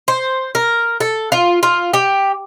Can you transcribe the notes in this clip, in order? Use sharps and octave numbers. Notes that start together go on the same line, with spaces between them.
C5
A#4
A4
F4
F4
G4